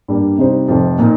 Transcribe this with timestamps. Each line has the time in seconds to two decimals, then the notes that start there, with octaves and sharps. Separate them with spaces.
0.08 G2 G3 A#3
0.38 C3 G3 D#4 C5
0.68 F1 F2 C3 F3
0.99 A#2 A#3 D#4